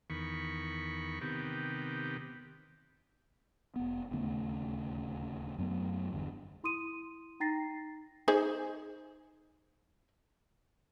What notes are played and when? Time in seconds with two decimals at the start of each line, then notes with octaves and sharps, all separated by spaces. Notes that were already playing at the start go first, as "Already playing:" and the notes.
0.10 E2 D#3 B5 C#6
1.21 C3 D#3 B3 G4
3.76 F1 B3
4.11 D1 D#2 C#3 A3
5.58 F#2 F#3 A3 B3
6.12 G1 E2 G2 D3
6.64 E4 C6 D#6 D#7
7.40 D#4 G5 A#5 A6 A#6 C7
8.28 D#4 G#4 C5